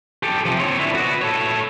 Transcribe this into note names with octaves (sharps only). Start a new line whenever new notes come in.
G4 A4
C3 F3
C4 C#5
D3 E4
B3 F#4
A4 C#5